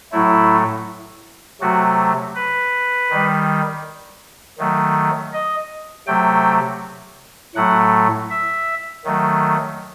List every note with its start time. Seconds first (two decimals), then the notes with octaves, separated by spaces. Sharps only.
0.12 A2 F#3 A3 E4
1.61 C3 F#3 A3 F#4
2.35 B4
3.10 D#3 G3
4.58 D#3 F#3 A3
5.33 D#5
6.07 C3 F#3 A3 G5
7.55 A2 F#3 A3 F#5
8.30 E5
9.05 D#3 F#3 A3